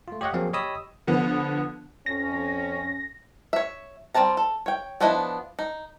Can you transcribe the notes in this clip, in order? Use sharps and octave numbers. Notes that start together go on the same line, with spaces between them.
A3 F4
G4 C#5 D#5 F5 F#5
F3 F#3 A#3 C4 G#4 F5
G4 C#5 D#5 B5 D#6 E6
D3 F3 B3
F2 C#4 A#6
C#5 E5
G3 C4 C#4 A5 A#5
A4
C#5 G5
F3 B3 D4 E4 D#5
D#4